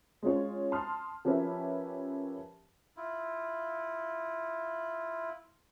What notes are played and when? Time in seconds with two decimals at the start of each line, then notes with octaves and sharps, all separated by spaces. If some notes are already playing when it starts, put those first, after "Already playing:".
0.23 G#3 C#4 F4 C#5
0.72 A5 C6 D#6 F6
1.25 F3 C#4 G4 A#4 B4 E5
2.97 E4 F4